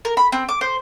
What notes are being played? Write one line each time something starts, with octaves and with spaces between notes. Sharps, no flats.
A#4
B5
C4
D6
C5